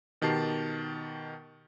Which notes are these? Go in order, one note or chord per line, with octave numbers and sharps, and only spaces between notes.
B2 D#3 G4 A5 C7